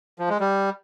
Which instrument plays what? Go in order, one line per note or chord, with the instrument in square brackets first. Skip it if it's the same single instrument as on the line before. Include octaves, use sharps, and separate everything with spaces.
[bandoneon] F3
G#3
G3